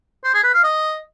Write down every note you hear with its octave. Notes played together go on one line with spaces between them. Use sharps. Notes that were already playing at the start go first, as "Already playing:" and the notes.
C5
G#4
B4
F5
D#5